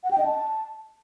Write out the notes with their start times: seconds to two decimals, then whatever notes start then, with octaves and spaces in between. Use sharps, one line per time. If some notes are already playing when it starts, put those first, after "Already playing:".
0.04 F#5
0.11 G5
0.18 D#5
0.25 A5